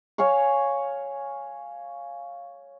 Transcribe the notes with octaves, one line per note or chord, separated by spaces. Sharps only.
C#5 F5 G#5 C#6